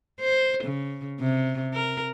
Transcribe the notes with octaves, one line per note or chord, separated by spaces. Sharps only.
C5
C#3
C3
A#4